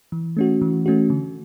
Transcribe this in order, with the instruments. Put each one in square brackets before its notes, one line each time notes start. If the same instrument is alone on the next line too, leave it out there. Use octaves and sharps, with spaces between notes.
[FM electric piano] E3
A3 C#4 F#4
E3
A3 C#4 F#4
D3